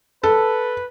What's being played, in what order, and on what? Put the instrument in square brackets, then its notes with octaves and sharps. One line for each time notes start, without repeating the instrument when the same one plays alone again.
[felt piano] A4 [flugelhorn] B4